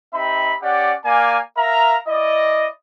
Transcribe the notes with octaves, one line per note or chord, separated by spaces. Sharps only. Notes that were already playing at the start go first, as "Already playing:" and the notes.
C4 D#4 G4 E5 B5
C#4 G4 D5 F#5
A#3 D5 F5 G#5
A#4 E5 F5 A#5
E4 D5 D#5